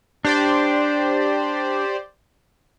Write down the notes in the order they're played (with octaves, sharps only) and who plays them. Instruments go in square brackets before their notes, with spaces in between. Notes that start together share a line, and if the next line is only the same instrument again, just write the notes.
[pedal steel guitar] D4 [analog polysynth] G4 C5 D5